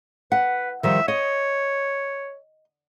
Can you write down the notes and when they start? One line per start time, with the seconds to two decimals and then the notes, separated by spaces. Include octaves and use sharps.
0.32 B4 F#5
0.83 D#3 F3 G3 E5
1.08 C#5 D#5